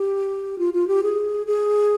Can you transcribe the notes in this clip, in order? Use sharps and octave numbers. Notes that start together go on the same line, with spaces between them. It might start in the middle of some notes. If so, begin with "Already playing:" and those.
Already playing: G4
F4
F4
G4
G#4
G#4